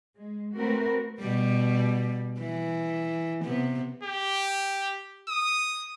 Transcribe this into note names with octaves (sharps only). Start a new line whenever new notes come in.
G#3
A3 C4 F#4 A#4 B4
B2 G3
E3
C3 B3
G4
D#6